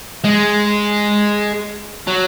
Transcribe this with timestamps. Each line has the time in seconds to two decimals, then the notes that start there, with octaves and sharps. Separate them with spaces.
0.24 G#3
2.07 F#3